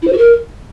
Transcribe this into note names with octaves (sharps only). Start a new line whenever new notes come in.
E4
C5
F#4
A#4